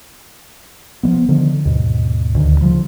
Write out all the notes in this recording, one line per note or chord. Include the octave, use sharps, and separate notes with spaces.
F3 G#3 B3
D3 D#3 F3
D#2 G#2 B2
D2 D3 D#3
C#3 F3 G3